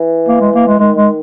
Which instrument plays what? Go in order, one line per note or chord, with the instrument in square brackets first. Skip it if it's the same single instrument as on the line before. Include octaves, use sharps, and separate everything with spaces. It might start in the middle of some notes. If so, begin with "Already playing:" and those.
Already playing: [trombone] E3
[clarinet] A#3
G#3
A#3
G#3
[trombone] D#3 [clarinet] G#3
[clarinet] G#3